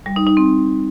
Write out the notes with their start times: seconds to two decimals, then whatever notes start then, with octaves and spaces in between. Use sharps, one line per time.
0.06 G3
0.16 D#4
0.27 D#4
0.37 C4